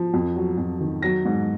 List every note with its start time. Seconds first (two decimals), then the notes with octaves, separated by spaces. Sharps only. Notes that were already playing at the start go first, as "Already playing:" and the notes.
Already playing: F3
0.14 F2
0.36 F#3
0.58 F2
0.81 D#3
1.02 F#3 A#6
1.25 G#2